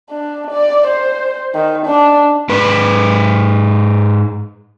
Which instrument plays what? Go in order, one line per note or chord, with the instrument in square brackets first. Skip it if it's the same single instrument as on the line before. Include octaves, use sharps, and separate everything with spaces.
[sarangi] D4
D5
C5
D#3
D4
[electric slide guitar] G#2 B4